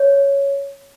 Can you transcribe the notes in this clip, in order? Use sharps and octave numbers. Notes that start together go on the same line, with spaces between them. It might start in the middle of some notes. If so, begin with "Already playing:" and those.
Already playing: C#5